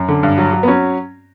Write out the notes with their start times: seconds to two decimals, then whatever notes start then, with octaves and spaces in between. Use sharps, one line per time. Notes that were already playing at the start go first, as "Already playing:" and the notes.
Already playing: F#2
0.08 D3
0.23 G2
0.38 F#3
0.53 F#3
0.63 B3
0.68 F#3 C#4